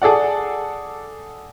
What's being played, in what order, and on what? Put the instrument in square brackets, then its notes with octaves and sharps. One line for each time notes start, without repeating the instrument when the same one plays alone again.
[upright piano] G#4 A4 D5 F#5